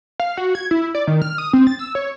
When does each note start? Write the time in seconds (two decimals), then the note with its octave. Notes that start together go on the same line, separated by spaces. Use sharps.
0.20 F5
0.37 F#4
0.55 G#6
0.71 E4
0.95 D5
1.07 D#3
1.22 F6
1.38 D#6
1.53 C4
1.67 A6
1.79 E6
1.95 C#5